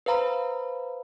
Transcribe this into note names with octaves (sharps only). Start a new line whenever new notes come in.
B4 C5 F5 A#5 B5